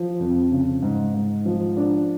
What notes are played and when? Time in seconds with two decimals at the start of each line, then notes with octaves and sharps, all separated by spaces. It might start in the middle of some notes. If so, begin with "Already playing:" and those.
Already playing: F3
0.20 F2
0.51 C#3
0.82 G#2
1.14 G#2
1.45 F3
1.77 D4